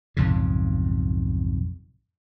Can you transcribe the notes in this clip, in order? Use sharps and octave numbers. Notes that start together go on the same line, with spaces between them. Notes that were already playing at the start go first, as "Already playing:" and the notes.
B1 F2 G#2 C#3